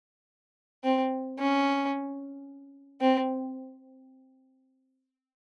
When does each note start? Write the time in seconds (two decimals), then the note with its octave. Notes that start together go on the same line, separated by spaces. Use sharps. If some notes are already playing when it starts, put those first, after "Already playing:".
0.84 C4
1.39 C#4
3.01 C4